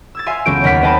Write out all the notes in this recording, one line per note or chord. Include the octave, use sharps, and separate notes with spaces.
E6 G#6 A6
E5 F5 G#5 C6
C#2 F#3 B3 A4 G6 D7
D#2 F#3 F#5 F6 B6
C4 B4 D#5 G5 A5 B5